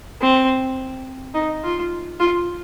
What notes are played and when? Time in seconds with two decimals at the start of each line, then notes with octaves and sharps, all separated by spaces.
0.21 C4
1.34 D#4
1.64 F4
2.20 F4